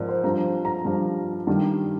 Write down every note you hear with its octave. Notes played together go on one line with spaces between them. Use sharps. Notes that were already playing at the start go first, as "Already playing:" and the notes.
Already playing: G#2 F3 A#4 D5
C5
G2 F3 A#5
A#5
G2 F3
G2 D#3 G3